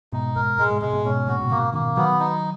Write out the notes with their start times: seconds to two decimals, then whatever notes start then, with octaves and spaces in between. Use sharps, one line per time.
0.12 G#2 B2 D#4
0.36 G#2 A#4
0.58 G#2 G#3
0.70 G#2
0.82 G#2 B2 G#3
0.93 G#2 B2
1.05 G#2 B2 C#4
1.28 A#2 C#3 F#4
1.41 B2
1.50 A#2 C#3 A#3
1.73 B2 D#3 A#3
1.97 D#3 F#3 B3
2.20 D#4